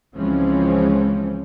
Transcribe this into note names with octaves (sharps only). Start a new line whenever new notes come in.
C#2 E3 F3 G#3 C4 C#4